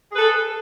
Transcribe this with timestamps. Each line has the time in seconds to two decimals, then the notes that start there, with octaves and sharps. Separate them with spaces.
0.11 G#4
0.14 B4
0.16 A4